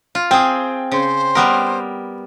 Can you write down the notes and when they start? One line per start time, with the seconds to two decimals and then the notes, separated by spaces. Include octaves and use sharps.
0.15 F4
0.31 C4 G#4 G5
0.91 C#3 C5
1.35 G3 B3 A#4